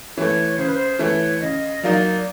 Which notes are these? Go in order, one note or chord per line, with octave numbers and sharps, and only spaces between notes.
E3 A3 C#5
C#3 C5
B4
C5
E3 A3 C#5
C#3 D#5
F#3 A#3 D#4 D5